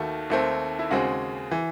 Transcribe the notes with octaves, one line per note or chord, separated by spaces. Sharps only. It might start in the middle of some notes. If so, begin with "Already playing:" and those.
Already playing: D#2 D#3 A3 F#4
D#2 D#3 A3 C4
E4
D#2 C#3 G#3 C4 F#4
E3